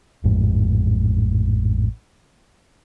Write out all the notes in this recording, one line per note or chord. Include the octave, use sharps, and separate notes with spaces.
A1 F2 G#2